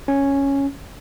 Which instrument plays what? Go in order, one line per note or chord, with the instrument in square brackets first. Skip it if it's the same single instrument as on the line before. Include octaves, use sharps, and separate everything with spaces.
[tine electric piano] C#4